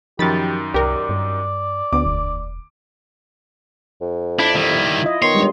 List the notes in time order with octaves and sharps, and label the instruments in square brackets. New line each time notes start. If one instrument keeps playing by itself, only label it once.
[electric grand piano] F#2 D#3 [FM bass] F3 [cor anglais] G4 [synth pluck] B5 A6
[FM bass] C2 [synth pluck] G4 A#4 [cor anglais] D5
[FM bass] G2
[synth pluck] D2 [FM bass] B3 [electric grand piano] D6
[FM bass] E1
[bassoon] F2
[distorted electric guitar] D4 [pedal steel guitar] E4
[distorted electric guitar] D#3 G3 [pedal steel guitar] E4
[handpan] F4 D#5
[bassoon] D#3 [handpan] B3 [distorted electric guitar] C#5 [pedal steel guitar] C6
[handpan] G3 G#3 D4